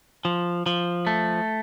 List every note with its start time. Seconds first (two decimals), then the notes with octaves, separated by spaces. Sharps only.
0.25 F3
0.66 F3
1.07 A3